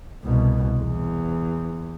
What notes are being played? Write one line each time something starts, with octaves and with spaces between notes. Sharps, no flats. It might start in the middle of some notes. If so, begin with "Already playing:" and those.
C2 B2
E2